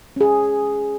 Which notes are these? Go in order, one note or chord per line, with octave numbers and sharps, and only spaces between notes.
C#4 G#4